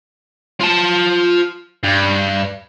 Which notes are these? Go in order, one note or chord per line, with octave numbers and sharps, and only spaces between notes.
F4 A5
G2